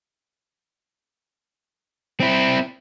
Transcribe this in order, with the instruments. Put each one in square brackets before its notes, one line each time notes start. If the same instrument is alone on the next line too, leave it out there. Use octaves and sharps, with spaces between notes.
[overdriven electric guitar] C4 E4